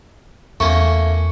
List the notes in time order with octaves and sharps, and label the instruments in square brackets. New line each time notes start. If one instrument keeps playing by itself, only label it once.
[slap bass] E2 [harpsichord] A3 A#3 C#4 [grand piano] C#6